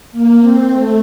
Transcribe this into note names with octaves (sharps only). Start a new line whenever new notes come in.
A#3
C4
A3